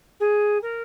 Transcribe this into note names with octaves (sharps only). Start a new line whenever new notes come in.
G#4
A#4